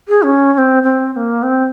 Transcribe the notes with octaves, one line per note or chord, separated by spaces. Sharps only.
G#4
C#4
C#4
C4
C4
C4
A#3
C4